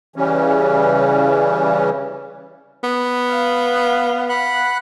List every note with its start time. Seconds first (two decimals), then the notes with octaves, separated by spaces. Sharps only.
0.16 C#3 E3 G3 C#4
2.83 B3
3.29 F5
4.29 F#5 B5 F#6